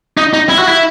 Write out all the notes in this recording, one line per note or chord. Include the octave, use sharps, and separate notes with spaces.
D#4
D#4
E4
F#4
E4